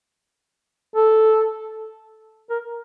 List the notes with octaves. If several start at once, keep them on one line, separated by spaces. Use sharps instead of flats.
A4
A#4